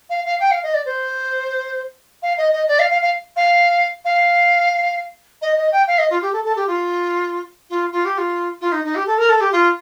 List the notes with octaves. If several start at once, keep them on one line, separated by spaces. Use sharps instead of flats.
F5
F5
G5
F5
D#5
D5
C5
F5
D#5
D#5
D5
F5
F5
F5
F5
F5
D#5
D#5
G5
F5
D#5
F4
G4
A4
A4
G4
F4
F4
F4
G4
F4
F4
D#4
D#4
G4
A4
A#4
A4
G4
F4